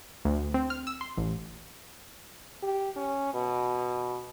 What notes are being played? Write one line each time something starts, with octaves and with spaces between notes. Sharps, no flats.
D2
C4
F6
E6
C6
A1
G4
C#4
B2